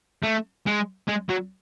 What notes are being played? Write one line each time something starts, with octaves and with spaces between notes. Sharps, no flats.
A3
G#3
G#3
F#3